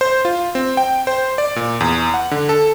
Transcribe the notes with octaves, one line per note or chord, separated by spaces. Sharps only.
C5
F4
C4
G5
C5
D5
A#2
E2
F#5
D3
A4